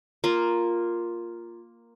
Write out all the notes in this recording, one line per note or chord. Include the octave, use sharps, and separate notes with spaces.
A#3 F4